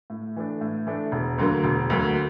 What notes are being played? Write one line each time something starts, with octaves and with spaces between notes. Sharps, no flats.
A2
E3 A3 D4
A2
E3 A3 D4
E1
D2 D3 F#3 A#3
E1
D2 D3 F#3 A#3